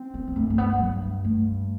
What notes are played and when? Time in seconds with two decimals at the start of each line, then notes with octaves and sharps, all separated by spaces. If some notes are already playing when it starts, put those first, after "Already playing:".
Already playing: C4
0.14 B3
0.28 B3
0.36 G2 A3
0.50 A3
0.58 B3
0.80 G2 F#3
1.24 G2 A3